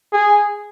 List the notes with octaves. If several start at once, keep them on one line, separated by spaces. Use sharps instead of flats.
G#4